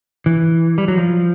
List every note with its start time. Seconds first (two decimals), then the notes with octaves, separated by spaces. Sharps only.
0.26 E3
0.78 G3
0.88 F#3
0.97 F3